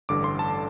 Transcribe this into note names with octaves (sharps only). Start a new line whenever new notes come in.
A1 G2 D3 D6
C6
A5